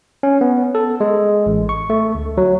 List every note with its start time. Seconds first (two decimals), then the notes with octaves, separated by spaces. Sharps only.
0.23 C#4
0.41 B3
0.75 A4
1.01 G#3
1.46 A1
1.69 C#6
1.90 A3
2.15 D2
2.38 F#3